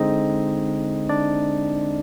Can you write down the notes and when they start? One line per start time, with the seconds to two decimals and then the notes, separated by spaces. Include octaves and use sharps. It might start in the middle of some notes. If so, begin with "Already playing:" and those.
Already playing: D3 G#3 C4 D#4 D#5
1.09 D4 D5